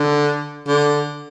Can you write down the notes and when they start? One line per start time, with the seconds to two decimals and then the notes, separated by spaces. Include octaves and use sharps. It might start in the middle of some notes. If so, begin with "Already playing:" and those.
Already playing: D3
0.68 D3